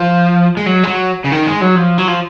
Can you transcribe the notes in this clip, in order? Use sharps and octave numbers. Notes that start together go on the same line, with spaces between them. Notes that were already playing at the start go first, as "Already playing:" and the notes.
Already playing: F3
G#3
F#3
G#3
F#3
C#3
D#3
G#3
F#3
F3
F#3
F3